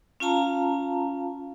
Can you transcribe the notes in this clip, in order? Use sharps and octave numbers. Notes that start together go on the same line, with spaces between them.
C#4 F4 F5 A5 A#5